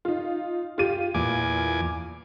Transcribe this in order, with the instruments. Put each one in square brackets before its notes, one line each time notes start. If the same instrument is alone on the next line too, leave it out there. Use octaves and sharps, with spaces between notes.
[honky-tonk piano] D#4 F4
F4 G4 D#7
[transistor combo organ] E2 G#5 D6 [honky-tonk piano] A#2